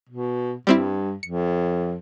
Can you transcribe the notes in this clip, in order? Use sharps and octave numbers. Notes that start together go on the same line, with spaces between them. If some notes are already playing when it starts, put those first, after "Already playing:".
B2
G2 G3 C4 E4
F2 C#7